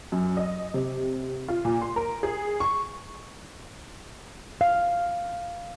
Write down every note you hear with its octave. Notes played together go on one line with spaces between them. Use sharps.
F#2
D#5
C3
F4
A#2
C6
A#4
G#4
C#6
F5